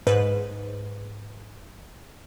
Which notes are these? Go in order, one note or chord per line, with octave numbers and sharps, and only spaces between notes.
G#2 B4 C5